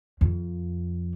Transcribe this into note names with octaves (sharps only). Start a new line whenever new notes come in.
F2